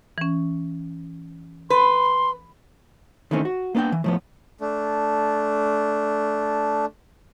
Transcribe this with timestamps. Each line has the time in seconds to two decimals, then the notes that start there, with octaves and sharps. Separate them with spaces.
0.18 E3 C#4
1.70 B4 C6
3.31 D#3 E3 A3 C4 C#4
3.45 F#4
3.75 A#3 B3 D4 F5 G5
3.92 E3
4.04 A2 F3 B3
4.61 A3 D4